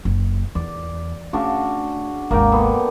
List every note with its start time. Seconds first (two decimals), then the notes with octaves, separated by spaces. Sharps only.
0.05 F#1
0.55 E2 D5
1.33 C#3 A3 D4 F#4
2.31 G#1 D#2 A#3 D5 G5
2.52 D3 B3